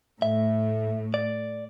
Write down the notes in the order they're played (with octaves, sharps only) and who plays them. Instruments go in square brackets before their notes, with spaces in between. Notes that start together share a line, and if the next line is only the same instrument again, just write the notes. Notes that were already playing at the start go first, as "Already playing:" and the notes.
[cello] A2 A3 [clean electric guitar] E5
[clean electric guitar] D5